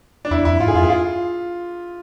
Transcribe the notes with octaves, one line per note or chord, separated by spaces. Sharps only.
D4
E2 E4
F2 E4
G#2 F4
G#4
F2 F4
G#4
F4